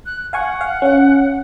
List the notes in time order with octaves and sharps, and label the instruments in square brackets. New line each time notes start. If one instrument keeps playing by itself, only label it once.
[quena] F#6
[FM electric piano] F5 G#5 C#6 [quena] F#5
[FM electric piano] F5
C#4 F5